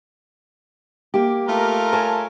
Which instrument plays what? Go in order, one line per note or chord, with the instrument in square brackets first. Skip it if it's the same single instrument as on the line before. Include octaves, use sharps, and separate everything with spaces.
[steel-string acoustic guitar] A#3 G4
[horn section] A3 F4 A#4
[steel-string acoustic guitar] C#5 G#5 A5